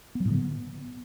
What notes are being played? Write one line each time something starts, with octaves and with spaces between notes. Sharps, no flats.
B3
F#3
A2
D3
B3